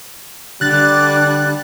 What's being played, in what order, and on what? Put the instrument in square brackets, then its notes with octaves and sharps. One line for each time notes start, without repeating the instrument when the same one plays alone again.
[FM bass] D3 [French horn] G3 [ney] D4 [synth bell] F#6 A6